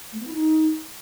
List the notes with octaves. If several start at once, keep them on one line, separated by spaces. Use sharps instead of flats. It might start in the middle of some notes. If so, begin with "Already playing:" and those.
A3
B3
E4
D#4